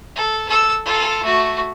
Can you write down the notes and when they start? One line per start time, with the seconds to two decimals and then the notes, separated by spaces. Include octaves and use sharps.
0.16 A4
0.48 A4 E6
0.85 F4 A4
1.23 A3 F#4